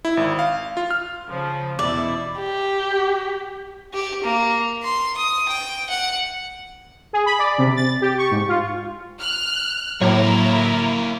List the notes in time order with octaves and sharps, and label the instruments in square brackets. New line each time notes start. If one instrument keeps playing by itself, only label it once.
[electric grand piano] E4
G#1
F5
F4
F6
[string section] C#3 F3
[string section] E2 B2 E4 [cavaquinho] D5
[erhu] G4
[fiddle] G4
A#3
C6
D#6
G5
F#5
[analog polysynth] G#4
B5
D5
C3
A6
G4
C#6
G#2
F4
[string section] F6 F#6
[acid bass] A2 [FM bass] F#3 [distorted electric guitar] A#3 C#5 [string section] E4 A#4